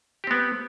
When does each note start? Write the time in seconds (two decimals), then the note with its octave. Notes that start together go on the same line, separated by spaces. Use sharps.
0.24 G4
0.27 C4
0.31 B3